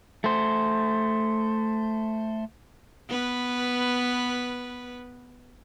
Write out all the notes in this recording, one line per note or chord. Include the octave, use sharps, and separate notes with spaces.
A3 C5
B3 B4